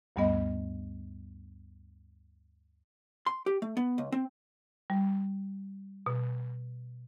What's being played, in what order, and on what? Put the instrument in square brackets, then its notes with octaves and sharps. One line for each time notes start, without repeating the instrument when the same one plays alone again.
[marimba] D2 G2 G3 A3 B3 D#5
[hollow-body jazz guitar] C6
G4
A3
B3
C#2
C4
[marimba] G3
B2